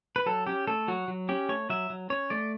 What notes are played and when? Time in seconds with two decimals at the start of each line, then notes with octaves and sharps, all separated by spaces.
0.16 B4
0.26 F#3 A4
0.47 C#4 G4
0.67 A3 A4
0.88 F#3 F#4
1.08 F#3
1.29 C#4 G4
1.49 A3 C#5
1.70 F#3 E5
1.90 F#3
2.10 C#4 C#5
2.30 A3 D5